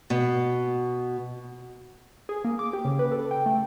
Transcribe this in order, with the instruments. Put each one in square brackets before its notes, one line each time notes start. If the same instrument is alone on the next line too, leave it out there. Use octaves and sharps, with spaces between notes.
[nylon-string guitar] B2
[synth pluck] G#4
A#3
D6
G4
C#3
B4
A4
G5
A3